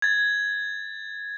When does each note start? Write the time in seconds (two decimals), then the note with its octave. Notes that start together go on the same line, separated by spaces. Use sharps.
0.02 G#6 A6